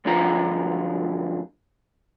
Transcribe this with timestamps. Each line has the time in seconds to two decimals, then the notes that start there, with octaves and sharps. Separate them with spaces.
0.05 B1 G2 D3 F3 F4 A#5